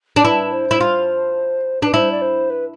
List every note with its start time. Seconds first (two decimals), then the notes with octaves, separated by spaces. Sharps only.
0.16 D4
0.24 E4 B4
0.52 C5
0.71 E4
0.81 F4
1.82 D4 B4
1.94 E4 C5
2.11 D5
2.22 C5
2.50 B4